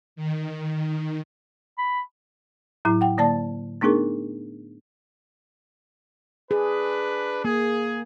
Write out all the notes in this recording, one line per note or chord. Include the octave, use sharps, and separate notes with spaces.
D#3
B5
A2 F#3 E4
F#5 G5
D3 A#3 D5 A5 A6
A3 B3 D4 D#4 G#4 A#4
D4 G#4 B4
A#3 G#4